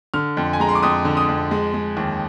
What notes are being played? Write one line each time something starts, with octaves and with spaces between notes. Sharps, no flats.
D3 F6
F2
G#5
G#3 A#5
C6
D6
F2 D#6
D3
D#6
F2
G#3
G#3
D#2